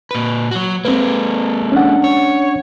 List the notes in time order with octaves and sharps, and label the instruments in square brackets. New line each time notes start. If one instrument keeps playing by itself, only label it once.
[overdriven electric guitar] A#2 B4
F#3 F#4
[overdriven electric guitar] G#3 A#3 [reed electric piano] C4 B4
[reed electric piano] C#4 D4 F#5
[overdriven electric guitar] C#5